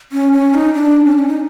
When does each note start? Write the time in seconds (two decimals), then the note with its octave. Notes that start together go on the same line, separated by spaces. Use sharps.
0.12 C#4
0.33 C#4
0.54 D#4
0.74 D4
1.05 C#4
1.12 D4
1.19 C#4
1.28 D#4